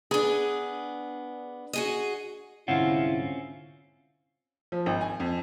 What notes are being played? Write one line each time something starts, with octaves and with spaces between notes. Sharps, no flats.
B3 D4 G#4
F#4 G#4 D#5
C2 G#2 D3 C4 C#4 E4 F4 F#5
F3
G#1
G#5
F2